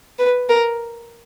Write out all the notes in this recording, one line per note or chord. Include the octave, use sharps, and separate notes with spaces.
B4
A#4